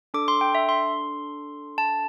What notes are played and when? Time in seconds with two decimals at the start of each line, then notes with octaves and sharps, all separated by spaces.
0.14 D4 A4 D6
0.28 C6
0.41 G5
0.55 E5
0.69 C6
1.78 A5